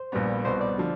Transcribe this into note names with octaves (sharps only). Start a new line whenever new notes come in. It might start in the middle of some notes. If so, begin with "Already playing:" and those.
Already playing: C5
A#1 A#2 G3 B3
C2 B2 G3 B3 C5
D5
D3 F3